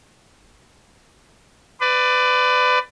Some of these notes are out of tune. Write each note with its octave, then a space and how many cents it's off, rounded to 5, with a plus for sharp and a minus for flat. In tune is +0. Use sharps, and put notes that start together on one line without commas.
B4 +25 D5 +10